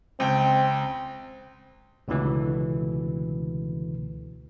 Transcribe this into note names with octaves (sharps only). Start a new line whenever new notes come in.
C#2 C4 G5
C#2 B2 D3 E3 A3